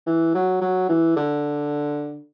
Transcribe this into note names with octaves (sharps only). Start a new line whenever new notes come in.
E3
F#3
F#3
E3
D3